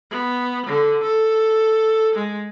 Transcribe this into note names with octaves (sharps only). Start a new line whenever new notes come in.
B3
D3
A4
G#3